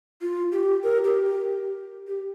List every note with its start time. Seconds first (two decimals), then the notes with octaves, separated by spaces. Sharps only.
0.22 F4
0.52 G4
0.84 A#4
1.04 G4
1.25 G4
2.07 G4